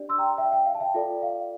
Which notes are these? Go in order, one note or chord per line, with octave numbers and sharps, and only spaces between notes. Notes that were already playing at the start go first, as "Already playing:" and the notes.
Already playing: D4 G4 D5
C6 E6
G5 A#5
E5 G5
E5 G5
F5
A5
E5 G5
F4 A4 D5
F5